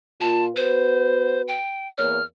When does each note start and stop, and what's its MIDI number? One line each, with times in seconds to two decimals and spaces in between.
0.21 0.50 46
0.21 0.50 65
0.21 0.45 81
0.56 1.57 59
0.56 1.57 66
0.56 1.57 71
0.56 1.42 72
1.48 1.88 79
1.98 2.19 40
1.98 2.19 58
1.98 2.19 73
1.98 2.24 89